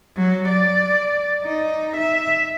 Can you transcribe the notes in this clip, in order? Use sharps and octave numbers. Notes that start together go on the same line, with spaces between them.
F#3
D5
D#4
E5